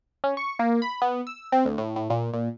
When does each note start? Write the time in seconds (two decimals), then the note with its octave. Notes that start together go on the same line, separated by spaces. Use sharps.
0.24 C#4
0.37 C#6
0.59 A#3
0.82 B5
1.02 B3
1.27 E6
1.52 C4
1.65 D2
1.78 A2
1.96 A2
2.10 A#2
2.34 A#2